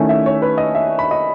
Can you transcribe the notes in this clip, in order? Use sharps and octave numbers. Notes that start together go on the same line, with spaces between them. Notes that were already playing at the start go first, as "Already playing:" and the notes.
Already playing: D#3 A3 C#4 E4 G#5
E5
C#5
B4
D#5
E5
B5
D#5